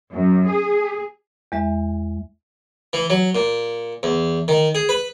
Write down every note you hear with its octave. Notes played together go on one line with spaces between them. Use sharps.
F#2
G#4
E2 G#3 E5
E3
F#3
A#2
E2
D#3
G#4
B4